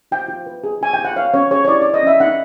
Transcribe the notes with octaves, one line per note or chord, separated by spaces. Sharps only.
F4 G5
F4
B4
G#4
F4 G#5
G5
F4
F#5
C#5 F5
C#4 C#5
G#4 C#5
C#5
E4 D5
C#5 D5
D#5
C#4 E5
D#4 F#5